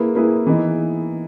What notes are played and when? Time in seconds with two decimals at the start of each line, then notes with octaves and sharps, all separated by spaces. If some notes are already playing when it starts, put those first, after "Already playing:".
Already playing: A#3 E4 G#4 B4
0.15 A#3 E4 G#4 B4
0.47 E3 B3 D#4